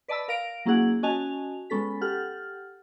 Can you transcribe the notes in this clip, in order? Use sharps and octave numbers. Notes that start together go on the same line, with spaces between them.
B4 D5 D#5 A5 B5 E6
A#4 F5 A#6 D7
F#3 A#3 C#4 E4 G#4 F#5
C#4 F#4 D#5 G#5 A5 F7
G#3 B3 C#4 A4 B6
G4 A4 F#5 F6